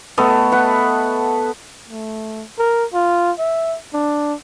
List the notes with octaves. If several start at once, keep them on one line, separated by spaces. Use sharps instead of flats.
A3 B3 A4 D#5
B4 F#5
A3
A#4
F4
E5
D4